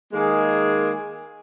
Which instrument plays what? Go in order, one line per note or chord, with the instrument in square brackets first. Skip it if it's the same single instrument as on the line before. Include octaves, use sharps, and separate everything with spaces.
[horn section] D#3 G#3 A#3 G#4